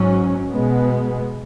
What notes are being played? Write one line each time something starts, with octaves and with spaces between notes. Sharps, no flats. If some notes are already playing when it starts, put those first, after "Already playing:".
Already playing: G#2 F#3 C#4
B2 G#3 B3